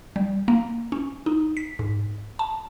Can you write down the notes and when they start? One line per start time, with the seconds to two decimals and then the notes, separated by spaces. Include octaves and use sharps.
0.16 G3
0.48 A#3
0.92 C#4
1.26 D#4
1.57 B6
1.79 G#2
2.39 A5